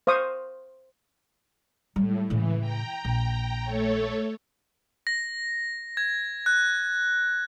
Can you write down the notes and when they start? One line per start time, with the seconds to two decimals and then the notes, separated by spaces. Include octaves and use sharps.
0.07 C5 F5 C#6 D#6
1.96 A2 G3
2.30 A2 C#3 E3
2.60 G5 A#5
3.05 A#1
3.64 A3 A4 C#5
5.07 A#6
5.97 G#6
6.46 F#6